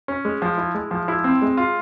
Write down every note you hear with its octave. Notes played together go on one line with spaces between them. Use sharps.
C#4
G#3
F3
E4
G#3
F3
E4
C4
G#3
F4